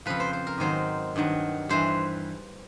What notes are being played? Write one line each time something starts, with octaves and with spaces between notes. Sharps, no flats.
F2 C#3 F3 B4
C5
C5
A#4
G#2 D#3 F#3 C5
G2 D#3 F#3
G2 E3 C5